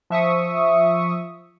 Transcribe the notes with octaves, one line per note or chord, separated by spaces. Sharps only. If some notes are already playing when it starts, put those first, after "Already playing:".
F3 E5 C#6 D#6